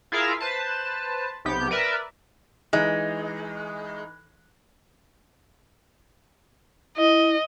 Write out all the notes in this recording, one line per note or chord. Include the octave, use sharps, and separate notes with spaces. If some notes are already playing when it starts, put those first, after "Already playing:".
E4 F4 G#4 A#4 E5 F5
B4 C5 A5
B1 C3 B3 G4 G6
A#4 B4 D5 E5
E3 G#3 D#4
E4 D#5